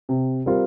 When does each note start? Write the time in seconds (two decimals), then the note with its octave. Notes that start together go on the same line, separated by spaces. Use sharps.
0.09 C3
0.46 G3 C4 F4 A#4